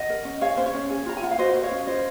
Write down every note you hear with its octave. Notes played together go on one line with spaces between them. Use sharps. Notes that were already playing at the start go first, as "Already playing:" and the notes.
Already playing: D#5 F#5
A#4
C#4
G#4 C#5 F5
C#4 C5
C#5
C#4
G#4
F4 A#5
G#5
F4 F#5
F5
F#4 C5 D#5
A#4 D#5
C#5 F5
C#4
F4 C5 D#5